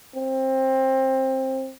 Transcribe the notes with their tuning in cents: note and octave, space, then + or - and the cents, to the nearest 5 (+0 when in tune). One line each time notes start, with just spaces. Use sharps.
C4 +20